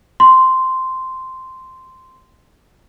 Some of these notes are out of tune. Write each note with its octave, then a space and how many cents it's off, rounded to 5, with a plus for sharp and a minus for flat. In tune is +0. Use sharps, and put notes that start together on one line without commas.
C6 -5